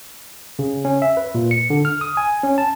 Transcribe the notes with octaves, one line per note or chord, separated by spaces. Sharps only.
C#3
C#4
E5
B4
A#2
C#7
D3
F6
D#6
G#5
C#4
A5